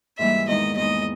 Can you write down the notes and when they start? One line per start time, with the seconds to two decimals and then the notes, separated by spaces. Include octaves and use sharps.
0.18 G#2 E3 G3 A#3 E5
0.48 E2 D#3 G#3 D#4 D#5
0.77 E2 D#3 G#3 D#4 D#5